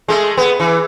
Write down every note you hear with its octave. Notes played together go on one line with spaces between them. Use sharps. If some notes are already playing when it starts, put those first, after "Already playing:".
G#3 A3
B3
E3